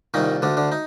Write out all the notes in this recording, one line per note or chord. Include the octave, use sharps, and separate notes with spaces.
C2 A#2 D#3 D#4
D2 D3 D4
D3 D4
D#4